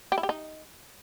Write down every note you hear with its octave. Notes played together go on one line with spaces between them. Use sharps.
G4
E4
G4
D#4